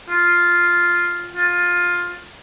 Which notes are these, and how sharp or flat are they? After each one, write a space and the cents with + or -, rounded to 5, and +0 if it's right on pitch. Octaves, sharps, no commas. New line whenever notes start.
F4 +0
F4 +15